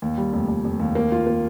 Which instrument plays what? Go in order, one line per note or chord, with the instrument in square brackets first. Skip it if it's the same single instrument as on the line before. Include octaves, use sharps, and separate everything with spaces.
[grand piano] D#2
G3
F1
F1
F1
D#2
A#3
F4
A#3